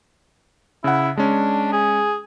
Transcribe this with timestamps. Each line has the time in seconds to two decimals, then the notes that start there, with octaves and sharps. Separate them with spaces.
0.84 C#3 E4 F#5
1.17 G#3 C#4 D4
1.73 G#4